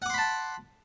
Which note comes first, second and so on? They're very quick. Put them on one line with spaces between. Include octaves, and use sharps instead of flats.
F#5 D6 C6 B5 A5